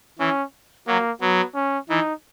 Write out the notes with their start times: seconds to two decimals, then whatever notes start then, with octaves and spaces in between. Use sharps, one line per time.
0.19 E3 C#4
0.87 F#3 A#3
1.21 F#3 B3
1.55 C#4
1.89 E3 D#4